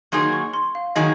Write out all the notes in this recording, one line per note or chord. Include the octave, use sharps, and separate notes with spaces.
D#3 F#3 A#3 D#4 G#4 C6
C#6
C6
F5
D#3 F#3 A#3 D#4 G#4 D#5